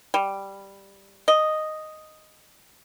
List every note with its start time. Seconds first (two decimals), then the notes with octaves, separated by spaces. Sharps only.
0.14 G3
1.28 D#5